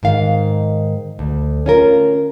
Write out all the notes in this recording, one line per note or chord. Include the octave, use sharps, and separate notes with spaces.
G#2 D#3 F5
D2
C#4 F4 A#4